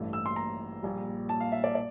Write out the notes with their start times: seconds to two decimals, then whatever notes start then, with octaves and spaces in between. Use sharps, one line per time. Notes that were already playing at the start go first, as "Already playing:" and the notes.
Already playing: A1 G2 E3 A3
0.13 E6
0.26 C6
0.36 A#5
0.83 A#1 A#2 G3
1.29 A5
1.40 F5
1.52 E5
1.64 D5
1.75 D5